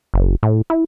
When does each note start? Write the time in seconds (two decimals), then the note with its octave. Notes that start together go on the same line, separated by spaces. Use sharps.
0.14 F#1
0.43 A2
0.70 E4